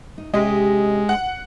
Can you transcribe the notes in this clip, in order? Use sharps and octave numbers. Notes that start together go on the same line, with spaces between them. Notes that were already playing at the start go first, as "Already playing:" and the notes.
D#4
C3 G#3 C#4 G4 D#5
F#5